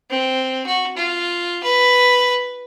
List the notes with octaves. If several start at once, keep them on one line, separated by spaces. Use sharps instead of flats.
C4
F#4
F4
B4